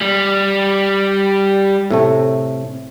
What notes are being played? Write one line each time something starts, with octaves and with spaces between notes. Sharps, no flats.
G3
A2 C3 A3